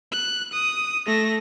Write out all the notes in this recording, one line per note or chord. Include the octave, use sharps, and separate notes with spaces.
F#6
D#6
A3 A#6